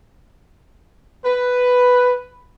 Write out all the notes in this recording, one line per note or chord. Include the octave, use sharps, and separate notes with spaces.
B4